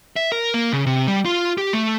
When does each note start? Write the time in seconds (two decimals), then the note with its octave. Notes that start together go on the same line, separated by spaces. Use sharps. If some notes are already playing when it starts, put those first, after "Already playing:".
0.16 E5
0.32 A#4
0.54 A#3
0.73 C#3
0.87 C3
1.07 G3
1.25 F4
1.58 G4
1.73 A3